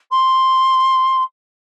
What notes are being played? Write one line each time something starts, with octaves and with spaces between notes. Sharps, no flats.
C6